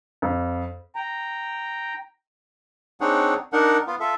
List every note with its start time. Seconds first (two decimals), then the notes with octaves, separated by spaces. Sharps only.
0.22 F2
0.96 G5 A#5
3.01 C4 D4 D#4 G#4 C#5 F#5
3.53 D4 D#4 A#4 F#5
3.87 B3 F4
4.00 F4 A4 E5